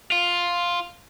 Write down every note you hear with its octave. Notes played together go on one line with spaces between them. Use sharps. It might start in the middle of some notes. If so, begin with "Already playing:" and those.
F4